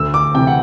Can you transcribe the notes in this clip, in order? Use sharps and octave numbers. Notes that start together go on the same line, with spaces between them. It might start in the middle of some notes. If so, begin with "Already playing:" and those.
Already playing: D2 E6
D6
C3 E3 G5
F#5